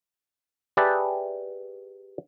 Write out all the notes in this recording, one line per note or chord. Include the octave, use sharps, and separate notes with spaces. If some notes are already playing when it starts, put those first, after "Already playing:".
G4 G#4 B4 D5 E5 A5